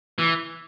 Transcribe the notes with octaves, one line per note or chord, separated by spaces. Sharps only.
E3